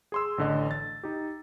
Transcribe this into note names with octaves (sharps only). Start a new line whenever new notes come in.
G#4 C6 E6
A1 D3 D#5
A6
D#4 G4